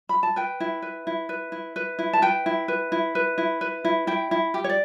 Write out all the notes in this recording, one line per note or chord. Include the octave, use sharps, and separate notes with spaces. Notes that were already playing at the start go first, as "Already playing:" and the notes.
B5
A5
B4 G5
E4
B4
E4
B4
E4
B4
E4
A5
B4 G5
E4
B4
E4
B4
E4
B4
E4
E4 G5
E4
G4
C#5
D5